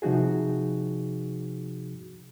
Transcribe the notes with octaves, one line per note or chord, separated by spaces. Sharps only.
C3 F3 D#4 F#4 G#4